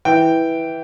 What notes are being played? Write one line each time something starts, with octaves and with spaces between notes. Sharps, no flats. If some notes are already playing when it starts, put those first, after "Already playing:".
E3 G5